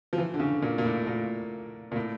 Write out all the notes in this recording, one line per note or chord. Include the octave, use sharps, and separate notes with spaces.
F3
E3
D3
C#3
A#2
A#2
A2
A#2
A#2
A2